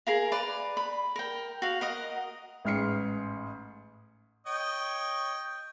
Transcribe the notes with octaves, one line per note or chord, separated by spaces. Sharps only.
G#4 A#4 F5
B4 D5 A#5
B5
A#4 G5
F#4 F5
A#4 D#5 F#5
A1 G#2 F6 C7 C#7
C#5 D#5 G5